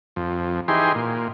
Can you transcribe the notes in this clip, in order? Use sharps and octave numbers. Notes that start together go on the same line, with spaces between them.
F2
E3 D#4 G4 G#4 C6
A#2